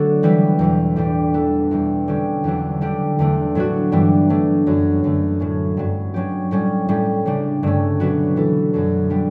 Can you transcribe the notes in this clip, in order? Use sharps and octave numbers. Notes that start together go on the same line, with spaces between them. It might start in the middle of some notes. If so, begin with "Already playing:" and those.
Already playing: D3 F#3 A3 D4 F#4 A4
E3 G3 B3
E2 B2 G3
A2 G3 D4 G4
E3 B3 E4 A4
E2 B2 G3
D3 G3 C#4 G4
E2 D3 F#3 B3 D4
D3 G3 D4 G4
E2 D3 A3 D4
A2 F#3 B3 D4 F#4
G2 E3 G3 B3 D4
F#3 A3 D4
F#2 D3 F#3
F#2 D3 A3
A2 F#3 C#4
G2 F#3 B3
F#3 C#4 G4
A2 G3 C#4
A2 G3 C#4
C#3 G3 D4
G2 D3 A3 C#4
B2 F#3 B3 D4 F#4
E3 B3 E4 A4
F#2 D3 F#3
D3 G3 B3 D4